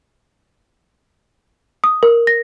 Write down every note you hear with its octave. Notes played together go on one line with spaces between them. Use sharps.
D#6
A#4
A#6